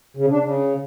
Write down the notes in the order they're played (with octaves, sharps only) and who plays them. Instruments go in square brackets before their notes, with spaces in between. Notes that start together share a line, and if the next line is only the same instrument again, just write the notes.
[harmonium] C#3
D4
C#3